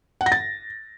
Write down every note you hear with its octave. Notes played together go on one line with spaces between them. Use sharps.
F#5
A#6
A6